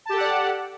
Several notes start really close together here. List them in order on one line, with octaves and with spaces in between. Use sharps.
A5 G4 A4 F#5 D5